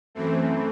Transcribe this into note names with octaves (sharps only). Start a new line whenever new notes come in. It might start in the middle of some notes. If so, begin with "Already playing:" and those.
F#2 E3 A3 C4